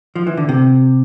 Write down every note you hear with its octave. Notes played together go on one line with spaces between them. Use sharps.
F3
E3
D3
C3